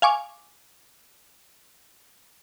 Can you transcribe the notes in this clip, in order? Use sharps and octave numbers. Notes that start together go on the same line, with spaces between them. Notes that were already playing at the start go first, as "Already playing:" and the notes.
F5 G#5 C#6 D6